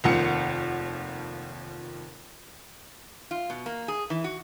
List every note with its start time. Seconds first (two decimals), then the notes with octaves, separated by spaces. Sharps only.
0.04 F1 D#2 F3 F#5 C#7
3.31 F4
3.50 B2
3.66 A#3
3.88 G#4
4.10 E3
4.24 F#4